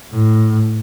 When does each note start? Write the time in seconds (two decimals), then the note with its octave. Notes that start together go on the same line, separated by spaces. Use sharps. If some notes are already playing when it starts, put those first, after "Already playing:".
0.12 A2